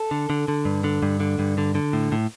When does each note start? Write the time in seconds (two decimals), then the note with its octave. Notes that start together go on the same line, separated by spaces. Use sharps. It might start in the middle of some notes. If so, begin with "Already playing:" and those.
Already playing: A4
0.11 D3
0.30 D3
0.48 D3
0.65 G2
0.84 D3
1.03 G2
1.20 D3
1.39 G2
1.58 D3
1.75 D3
1.93 A2
2.12 A2